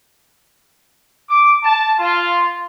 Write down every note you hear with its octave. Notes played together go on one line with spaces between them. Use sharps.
D6
A5
F4